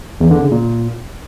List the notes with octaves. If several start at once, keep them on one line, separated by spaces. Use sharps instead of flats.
E2
D3
C#3
A#2